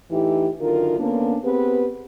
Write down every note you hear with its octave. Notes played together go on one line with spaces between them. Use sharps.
A2 E3 D#4 E4 G4
F#2 D3 D#3 F4 A#4
D3 A#3 B3 C#4 D4
B3 C4 G4 G#4 B4